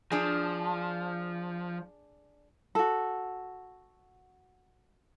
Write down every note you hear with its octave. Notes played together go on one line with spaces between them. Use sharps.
F3 D4 G#4
F#4 A4